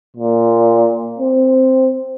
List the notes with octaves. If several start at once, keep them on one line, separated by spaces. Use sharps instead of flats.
A#2
C4